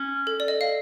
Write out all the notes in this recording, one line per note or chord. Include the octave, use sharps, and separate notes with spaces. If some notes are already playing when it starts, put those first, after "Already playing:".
Already playing: C#4
A4
D5
D#5
F5